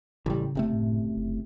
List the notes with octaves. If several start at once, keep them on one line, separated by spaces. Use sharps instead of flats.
A1 C#3 G3
F#1 C3 A3
A2
F1